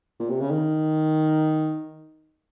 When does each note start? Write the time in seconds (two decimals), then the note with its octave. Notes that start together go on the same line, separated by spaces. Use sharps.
0.20 A#2
0.30 C3
0.41 C#3
0.50 D#3